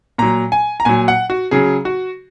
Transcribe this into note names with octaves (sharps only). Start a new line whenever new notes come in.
A#2 F#3 A#5
G#5
A#5
A#2 F#3 G#5
F#5
F#4
C#3 F#3 G#4
F#4